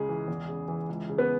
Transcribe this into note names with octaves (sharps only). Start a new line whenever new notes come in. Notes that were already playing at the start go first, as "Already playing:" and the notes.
Already playing: C#2 C#3 G#3 G#4
E3
E2
C#3
E3
C#2
C#3
B3 B4